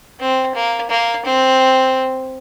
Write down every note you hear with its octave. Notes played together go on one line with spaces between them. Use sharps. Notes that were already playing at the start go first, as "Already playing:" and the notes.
C4
A#3
A#3
C4